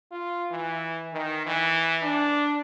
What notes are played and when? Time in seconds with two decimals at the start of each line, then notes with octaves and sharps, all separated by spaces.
0.12 F4
0.51 E3
1.13 D#3
1.46 E3
2.03 D4